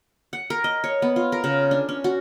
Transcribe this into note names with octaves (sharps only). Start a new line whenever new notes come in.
F#5
A#4
D#5
C#5
B3
F4
A#4
C#3
D4
C#4
F#4